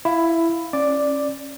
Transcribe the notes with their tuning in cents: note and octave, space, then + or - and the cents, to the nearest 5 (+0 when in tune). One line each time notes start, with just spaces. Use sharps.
E4 +10 F5 +0
C#4 -20 D5 +0